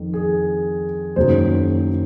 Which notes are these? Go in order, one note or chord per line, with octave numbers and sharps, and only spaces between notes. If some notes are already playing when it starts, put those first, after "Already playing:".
Already playing: F2 D#3
G#4
F#1 F#2 D#3 F#3 C5